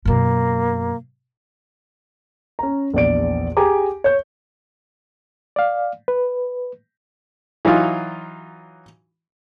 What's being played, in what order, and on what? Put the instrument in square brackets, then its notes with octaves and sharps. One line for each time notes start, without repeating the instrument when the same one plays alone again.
[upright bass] F#2 B2 [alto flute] A#3
[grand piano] C#4 A#5
A#1 E2 D5 D7
G4 G#4 G#5 A#5 D6
C#5 G6
[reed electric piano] D5 F5
B4
[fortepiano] E3 F#3 D#4 F4